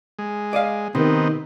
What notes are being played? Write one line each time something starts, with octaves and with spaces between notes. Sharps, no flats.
G#3
D5 D#5 F5
C3 D#3 B3 C4 D#4